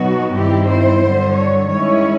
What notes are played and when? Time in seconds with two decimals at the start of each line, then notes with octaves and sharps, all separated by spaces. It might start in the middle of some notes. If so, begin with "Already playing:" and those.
Already playing: B2 F#3 B3 D#4 F#4
0.35 G2 D#3 G3 C4 E4 G4
0.69 C5
1.02 G2 D3 F#3
1.36 C#5
1.69 D#3 G#3 C#4 E4 C#5